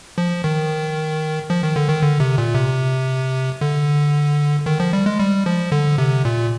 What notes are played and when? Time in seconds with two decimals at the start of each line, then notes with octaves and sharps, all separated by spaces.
0.18 F3
0.44 D#3
1.50 F3
1.63 D#3
1.76 D3
1.89 D#3
2.02 D3
2.20 C3
2.38 A#2
2.55 C3
3.61 D3
4.66 D#3
4.80 F3
4.93 G3
5.06 G#3
5.19 G3
5.46 F3
5.72 D3
5.98 C3
6.25 A#2